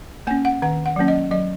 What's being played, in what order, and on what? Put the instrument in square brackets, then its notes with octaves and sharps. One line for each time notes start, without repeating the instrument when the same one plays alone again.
[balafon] A#3 C#4 G#5
F#5
D#3 F#5
F#5
F#3 A#3 C#4
D#5
F#3 D#5